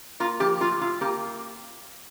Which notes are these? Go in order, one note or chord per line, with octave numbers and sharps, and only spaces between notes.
A#3 F4
F3 G4
A2 F4
A2 F4
A#3 G4